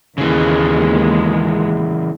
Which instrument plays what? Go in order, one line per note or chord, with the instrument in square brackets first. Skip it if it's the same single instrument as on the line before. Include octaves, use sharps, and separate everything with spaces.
[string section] D#2 G#3 [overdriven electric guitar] C#3 E3